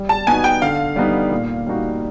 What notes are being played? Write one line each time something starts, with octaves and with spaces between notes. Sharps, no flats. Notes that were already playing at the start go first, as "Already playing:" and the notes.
Already playing: G3
A5
B3 D#4 F#4 G#5
G5
D3 F5
G3 B3 D#4
A#2
G3 A#3 D#4 F#4